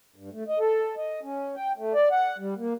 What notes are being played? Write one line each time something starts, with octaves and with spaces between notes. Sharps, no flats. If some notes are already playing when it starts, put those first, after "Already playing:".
G2
A3
D#5
A4
D#5
C#4
G5
A3
D5
F#5
G3
A#3